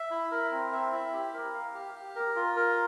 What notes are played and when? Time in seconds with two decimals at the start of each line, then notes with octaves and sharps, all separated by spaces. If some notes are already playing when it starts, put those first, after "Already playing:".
Already playing: E5
0.11 E4
0.31 A#4
0.52 C4
0.72 E5
0.92 E4
1.13 G4
1.33 A#4
1.54 F5
1.74 G4
1.95 G4
2.15 A#4
2.36 F4
2.56 A#4